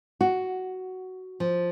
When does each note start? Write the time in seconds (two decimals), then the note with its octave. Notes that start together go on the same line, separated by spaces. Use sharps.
0.21 F#4
1.40 F3